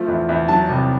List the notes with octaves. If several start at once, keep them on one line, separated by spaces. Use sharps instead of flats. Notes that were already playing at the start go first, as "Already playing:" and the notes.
Already playing: F3 A3
E2
E2
F#3 A5
C2